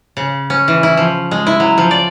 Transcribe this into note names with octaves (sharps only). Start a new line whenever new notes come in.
C#3
C#4
E3
E4
F3
G#3
E4
F#3
F3
D5